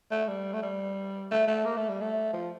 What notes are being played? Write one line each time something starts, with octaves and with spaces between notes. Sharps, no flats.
A3
G3
A3
G3
A3
A3
A#3
A3
G3
A3
F3